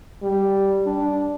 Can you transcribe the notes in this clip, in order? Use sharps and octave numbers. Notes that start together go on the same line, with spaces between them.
G3
D4